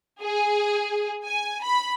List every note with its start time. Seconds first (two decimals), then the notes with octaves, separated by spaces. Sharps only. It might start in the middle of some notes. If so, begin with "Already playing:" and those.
0.22 G#4
1.25 G#5
1.63 B5